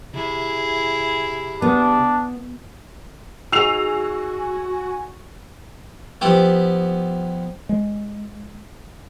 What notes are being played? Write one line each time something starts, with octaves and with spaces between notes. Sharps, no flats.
C3 E4 G#4
B3 D4
D#4 F#4 G#4 G#5 E6 C7 F7
F3 B3 E4 G4
G#3